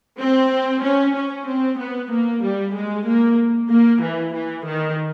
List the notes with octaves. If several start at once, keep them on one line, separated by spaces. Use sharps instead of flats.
C4
C#4
C#4
C4
B3
A#3
G3
G#3
A#3
A#3
E3
E3
D#3